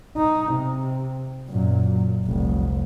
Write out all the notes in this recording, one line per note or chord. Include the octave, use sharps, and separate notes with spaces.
D#4
C3
F#2 A#2
F1 C2